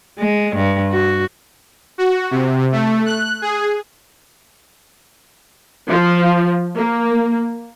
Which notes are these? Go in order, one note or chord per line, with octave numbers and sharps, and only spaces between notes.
G#3
G2
F#4
F#4
C3
A3
F#6
G#4
F3
A#3